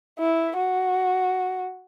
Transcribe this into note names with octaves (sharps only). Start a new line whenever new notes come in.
E4
F#4